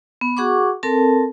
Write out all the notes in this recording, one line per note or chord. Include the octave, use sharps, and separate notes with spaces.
B3
F#4 G#4 F#5 C#6 D6
C4 A4 A#4 A5